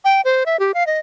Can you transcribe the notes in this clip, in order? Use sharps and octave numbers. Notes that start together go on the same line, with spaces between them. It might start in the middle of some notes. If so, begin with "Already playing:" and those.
G5
C5
E5
G4
F5
D#5